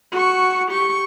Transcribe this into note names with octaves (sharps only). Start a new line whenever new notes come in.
F#4 C#6
G4 C#6